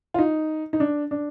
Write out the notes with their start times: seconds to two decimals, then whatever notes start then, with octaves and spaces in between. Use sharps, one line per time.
0.14 F4
0.18 D#4
0.73 D#4
0.80 D4
1.11 D4